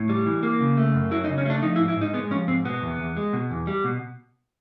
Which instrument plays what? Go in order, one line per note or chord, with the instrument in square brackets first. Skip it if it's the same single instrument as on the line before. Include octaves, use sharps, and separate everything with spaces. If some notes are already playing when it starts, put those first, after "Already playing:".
Already playing: [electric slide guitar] A2
G3
E3
A#3
C#3
A3
F#2
F#3 E4
D#4
C#3
C#4
A3 D4
F3 D#4
E4
G#2
E4
G#2 D#4
G#3 B3
F3 C#4
G#2 C4
B2 B3
E2
E2
G#3
B2
E2
G3
B2